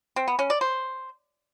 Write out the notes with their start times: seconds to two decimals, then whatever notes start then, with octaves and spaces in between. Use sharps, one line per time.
0.16 C4
0.28 B3
0.39 C#4
0.50 D5
0.61 C5